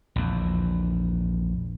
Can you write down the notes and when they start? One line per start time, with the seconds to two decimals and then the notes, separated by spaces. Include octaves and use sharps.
0.16 A#1 E2